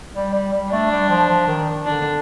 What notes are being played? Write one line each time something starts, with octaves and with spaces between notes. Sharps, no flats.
G3
G3
G3
A3 D4
G3
F3
F3
D#3
D3 D4